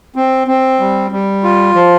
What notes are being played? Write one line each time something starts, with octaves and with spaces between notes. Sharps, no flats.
C4
C4
G3
G3
F4
F3